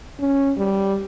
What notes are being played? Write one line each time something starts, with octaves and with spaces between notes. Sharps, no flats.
C#4
G3